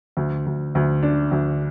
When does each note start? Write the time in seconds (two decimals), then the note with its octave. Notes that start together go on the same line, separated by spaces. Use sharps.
0.17 D2
0.46 D2
0.75 D2
1.03 D4
1.31 D2